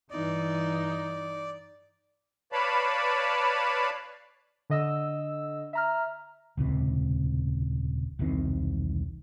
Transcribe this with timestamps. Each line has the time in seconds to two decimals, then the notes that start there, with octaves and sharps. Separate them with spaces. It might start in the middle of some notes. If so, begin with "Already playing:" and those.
0.11 G2 E3 D#4 D5
2.52 B4 C#5 D5 F5 A5 B5
4.70 D3 D#5 E6
5.73 E5 A#5 F6
6.57 D#1 C#2 C3
8.19 E1 C2 D#3 C4